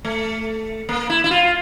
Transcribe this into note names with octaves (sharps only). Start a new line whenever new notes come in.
A3
A#3
E4
E4
F4